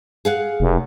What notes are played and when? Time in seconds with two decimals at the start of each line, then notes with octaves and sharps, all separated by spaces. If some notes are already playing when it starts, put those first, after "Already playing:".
0.25 G#4 F5 F#5
0.60 F1